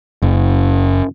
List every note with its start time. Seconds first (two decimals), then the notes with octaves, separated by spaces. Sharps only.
0.22 F#1